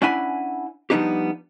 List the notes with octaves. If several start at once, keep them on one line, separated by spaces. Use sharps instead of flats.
C#4 D4 E4 F#5 G#5 B5
F3 G3 B3 D4 D#4 G4